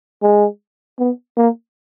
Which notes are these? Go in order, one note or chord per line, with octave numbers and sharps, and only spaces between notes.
G#3
B3
A#3